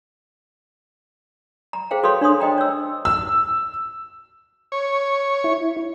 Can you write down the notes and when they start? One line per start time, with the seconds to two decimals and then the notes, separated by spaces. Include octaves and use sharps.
1.73 A#5
1.91 G#4 C5 F5 G5
2.04 F#4 A4 B4 C#5 F5 C6
2.21 D4 C#5 C6 D#6
2.40 C5 D#5 G5 A#5
2.58 C#5 E6
3.05 E6
4.72 C#5
5.44 E4